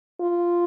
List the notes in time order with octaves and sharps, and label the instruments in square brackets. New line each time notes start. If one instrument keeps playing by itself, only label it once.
[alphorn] F4